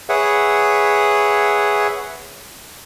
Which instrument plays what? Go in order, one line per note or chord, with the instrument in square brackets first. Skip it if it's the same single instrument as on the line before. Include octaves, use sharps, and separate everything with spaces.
[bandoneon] G#4 B4 C#5 E5 F#5